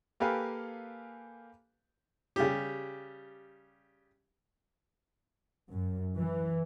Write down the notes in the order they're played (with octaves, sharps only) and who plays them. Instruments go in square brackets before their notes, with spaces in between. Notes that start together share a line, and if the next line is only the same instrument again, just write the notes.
[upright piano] A#3 G4 A4 B4 F5 G#5
[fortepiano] C#3 G3 G4
[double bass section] F#2
E3